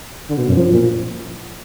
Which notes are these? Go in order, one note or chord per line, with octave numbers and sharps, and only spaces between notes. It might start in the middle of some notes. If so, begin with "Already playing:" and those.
D3
B2
F#2
F3
A#2